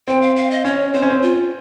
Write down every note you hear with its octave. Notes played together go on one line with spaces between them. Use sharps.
C4 G5
F5
F5
D#5
C#4 C#5
C4 C5
C#4
C4
F4